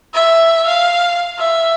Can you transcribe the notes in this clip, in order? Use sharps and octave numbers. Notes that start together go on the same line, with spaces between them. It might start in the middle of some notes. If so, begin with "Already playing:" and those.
E5
F5
E5